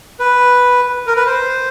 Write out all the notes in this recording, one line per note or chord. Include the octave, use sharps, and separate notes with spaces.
B4
A#4
B4
C5